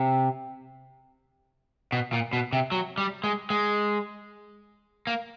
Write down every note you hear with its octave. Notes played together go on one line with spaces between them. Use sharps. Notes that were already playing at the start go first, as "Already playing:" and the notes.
Already playing: C3
B2
A#2
B2
C3
F#3
G3
G#3
G#3
A#3